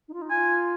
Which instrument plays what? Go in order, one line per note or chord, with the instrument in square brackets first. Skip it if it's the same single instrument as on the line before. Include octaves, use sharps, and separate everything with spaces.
[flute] D#4
F4
D#4
[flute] F4 [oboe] G#5